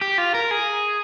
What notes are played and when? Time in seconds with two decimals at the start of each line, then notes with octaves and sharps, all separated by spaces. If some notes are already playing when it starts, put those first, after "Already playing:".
0.01 G4
0.18 F4
0.34 A#4
0.51 G#4